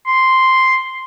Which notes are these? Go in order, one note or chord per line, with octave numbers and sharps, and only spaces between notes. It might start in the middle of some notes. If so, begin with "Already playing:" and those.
C6